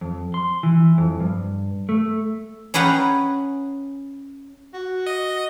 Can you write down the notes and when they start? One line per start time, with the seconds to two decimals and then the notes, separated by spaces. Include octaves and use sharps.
0.01 F2
0.34 C6
0.63 E3
0.98 F2
1.20 G2
1.89 A3
2.74 C#4 G#4 B4 F#5 G5 A#5
4.74 F#4
5.06 D#5